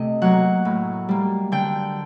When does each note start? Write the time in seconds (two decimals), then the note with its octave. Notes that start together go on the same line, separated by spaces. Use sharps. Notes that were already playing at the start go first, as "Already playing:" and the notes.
Already playing: C3 A3 D#5
0.22 F#3 A#3 F#5
0.65 A2
1.09 G3 A#3
1.52 D3 G5